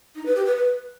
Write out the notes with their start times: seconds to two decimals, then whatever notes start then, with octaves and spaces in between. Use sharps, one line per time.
0.16 D#4
0.26 B4
0.36 G4
0.46 B4
0.56 B4